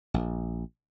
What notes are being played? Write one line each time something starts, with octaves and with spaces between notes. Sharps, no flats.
A#1